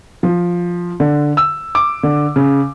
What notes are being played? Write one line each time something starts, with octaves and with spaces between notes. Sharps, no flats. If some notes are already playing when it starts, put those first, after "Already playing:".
F3
D3
E6
D6
D3
C#3